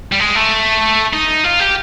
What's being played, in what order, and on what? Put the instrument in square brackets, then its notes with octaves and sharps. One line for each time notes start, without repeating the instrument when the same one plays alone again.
[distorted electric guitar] G3
G#3
A3
D#4
F4
G4